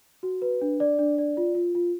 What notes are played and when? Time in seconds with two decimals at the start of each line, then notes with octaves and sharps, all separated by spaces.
0.23 F#4
0.42 B4
0.61 D4
0.80 D5
0.99 D4
1.18 D5
1.37 F4
1.55 F4
1.75 F4